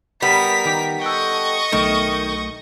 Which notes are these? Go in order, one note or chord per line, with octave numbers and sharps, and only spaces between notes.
G3 B3 A#4 B6
D#3 G4
A4 D#5 F#5 G5 C#6
B1 D#3 A3